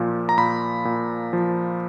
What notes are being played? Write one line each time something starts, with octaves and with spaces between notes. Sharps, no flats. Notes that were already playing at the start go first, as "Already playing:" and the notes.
Already playing: A#2 F3
A#5
A#2 B5
A#2
F3